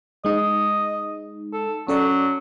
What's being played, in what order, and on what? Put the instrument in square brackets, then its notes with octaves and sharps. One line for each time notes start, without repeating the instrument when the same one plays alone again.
[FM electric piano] G#3 D#4 [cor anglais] D#5
[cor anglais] A4
[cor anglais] F#3 [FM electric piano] C#4 A4 D5